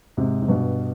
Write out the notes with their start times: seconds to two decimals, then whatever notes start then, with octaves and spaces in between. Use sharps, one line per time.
0.17 G#2 C3
0.42 G#2
0.48 G2 B2